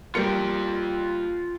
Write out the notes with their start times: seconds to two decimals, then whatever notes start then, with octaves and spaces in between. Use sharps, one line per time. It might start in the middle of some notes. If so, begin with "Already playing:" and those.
0.15 G3 A#3 F4 G5 C#7